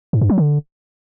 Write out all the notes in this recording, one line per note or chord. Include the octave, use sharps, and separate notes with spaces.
G#2
G2
F#3
D3